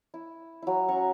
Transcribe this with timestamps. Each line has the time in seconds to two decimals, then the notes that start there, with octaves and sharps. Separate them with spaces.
0.14 E4
0.62 F#3 E4
0.88 C#4 F#4 A#5 C#6